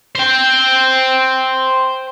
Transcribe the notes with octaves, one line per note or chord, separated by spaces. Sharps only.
C5 G5